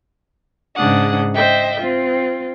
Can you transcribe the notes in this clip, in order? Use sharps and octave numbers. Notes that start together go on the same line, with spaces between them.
G#2 C#3 D4 F#5 D#6
C5 D#5 E5 G5
C4 F4